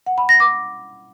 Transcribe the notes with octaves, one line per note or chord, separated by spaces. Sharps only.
F#5
B5
A#6
D6